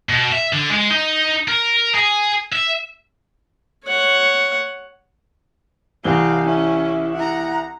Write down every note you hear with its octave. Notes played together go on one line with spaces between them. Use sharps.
B2
E5
D3
G#3
D#4
A#4
G#4
E5
C#5 F#5
C2 E3 C4 F5 G7
C#4 E4
E4 F#5 A#5